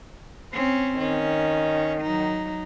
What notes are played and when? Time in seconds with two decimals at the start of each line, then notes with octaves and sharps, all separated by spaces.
0.52 C4 C#4
0.99 D#3 C#4
2.02 F#3 D#4